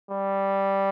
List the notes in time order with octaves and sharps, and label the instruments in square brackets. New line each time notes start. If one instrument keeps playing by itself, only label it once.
[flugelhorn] G3